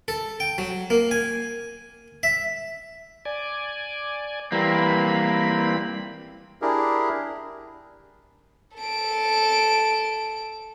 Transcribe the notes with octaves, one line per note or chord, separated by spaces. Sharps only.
A4
G5
F#3
A#3
G#5
E5
D5 G#5
E3 G3 A#3 C4 B5
D4 E4 G4 G#4 A#4
A4 D7